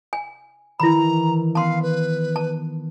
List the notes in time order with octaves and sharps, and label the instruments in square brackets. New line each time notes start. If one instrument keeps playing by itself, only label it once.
[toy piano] G#5
[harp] D#3 E3 [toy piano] E4 B5 [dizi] A#5
[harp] B3 [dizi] F5 [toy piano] A5 C6
[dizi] B4
[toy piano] A5